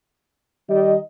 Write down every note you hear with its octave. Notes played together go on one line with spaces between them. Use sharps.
D#3 G3 G4 D#5